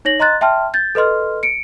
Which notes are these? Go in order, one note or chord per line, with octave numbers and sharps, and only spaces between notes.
D#4 C#5 A#6 F#7
D#5 A#5 C6 F#6 A6
E5 G5 A5 C6 F6
G6 A6
A4 B4 D#5 C6 F6
C#7 D7